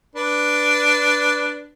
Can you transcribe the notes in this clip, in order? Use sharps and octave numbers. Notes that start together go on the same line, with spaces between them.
D4 B4